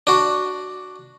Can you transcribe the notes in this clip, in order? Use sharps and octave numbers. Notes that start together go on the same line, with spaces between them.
D4 F#4